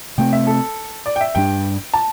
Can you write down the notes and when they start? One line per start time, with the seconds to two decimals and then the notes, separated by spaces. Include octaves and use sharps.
0.18 C3 A3 C4 G5
0.33 E5
0.47 A4
1.06 D5
1.16 G5
1.21 E5
1.35 G2 G3 D4 G5
1.94 A5